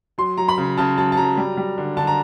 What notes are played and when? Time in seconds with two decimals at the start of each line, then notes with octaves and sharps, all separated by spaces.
0.18 F#3 C6
0.37 F#3 A#5
0.48 B5
0.58 C#3
0.77 C#3 A5
0.98 F#3 A5
1.12 A5
1.17 F#3 A#5
1.37 G3
1.57 G3
1.78 D3
1.97 D3 A5
2.07 A#5